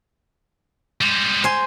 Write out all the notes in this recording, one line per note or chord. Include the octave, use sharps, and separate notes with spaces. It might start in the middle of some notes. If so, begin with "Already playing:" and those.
G3 G#3
C5 G#5